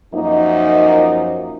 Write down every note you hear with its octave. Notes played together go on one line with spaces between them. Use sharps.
F#2 F3 A#3 D#4